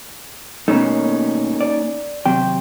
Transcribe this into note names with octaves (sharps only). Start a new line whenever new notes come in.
B2 A3 A#3 C#4 D#4
D5
D#2 C3 F#3 G5